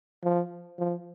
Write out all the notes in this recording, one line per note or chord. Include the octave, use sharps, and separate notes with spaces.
F3
F3